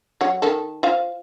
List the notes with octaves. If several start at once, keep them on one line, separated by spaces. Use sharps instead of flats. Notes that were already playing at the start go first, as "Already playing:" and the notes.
F#3 C#5 F#5
D#3 A4
F4 C5 F5